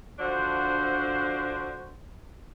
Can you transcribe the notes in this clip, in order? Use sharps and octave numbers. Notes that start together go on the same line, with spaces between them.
D3 F3 D4 F#4 C5